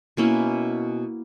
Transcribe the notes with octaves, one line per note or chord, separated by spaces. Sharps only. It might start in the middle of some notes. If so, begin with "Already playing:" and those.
B2 A#3 C#4 E4